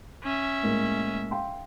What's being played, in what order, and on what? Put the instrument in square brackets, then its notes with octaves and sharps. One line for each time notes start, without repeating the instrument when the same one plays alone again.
[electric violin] C#4 E5
[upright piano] A2 G#3 A#3
F5 G5 C6